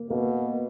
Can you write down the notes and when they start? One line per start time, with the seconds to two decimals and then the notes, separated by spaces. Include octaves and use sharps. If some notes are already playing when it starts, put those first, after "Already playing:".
Already playing: A#3
0.10 B2 A#3